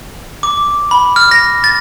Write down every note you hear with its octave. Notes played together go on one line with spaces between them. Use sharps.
D6
B5
F6
A#6
A6